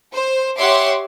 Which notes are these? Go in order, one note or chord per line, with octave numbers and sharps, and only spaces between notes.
C5
G4 C#5 E5 F#5 C6 D6